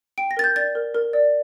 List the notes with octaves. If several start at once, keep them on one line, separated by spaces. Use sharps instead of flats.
G5 D7
A#6
A#4 A6
G6
D5 A6
A#4
A#4
D5